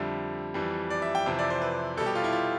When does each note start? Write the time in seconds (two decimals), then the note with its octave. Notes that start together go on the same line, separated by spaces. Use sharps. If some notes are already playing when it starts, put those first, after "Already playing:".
Already playing: F2 D3 G3 E5
0.54 F2 E3 G3
0.90 D5
1.02 E5
1.15 G5
1.26 F2 C3 E3 E5
1.39 D5
1.50 C5
1.62 B4
1.97 B2 G3 A4
2.06 G4
2.15 F4
2.24 E4
2.32 F4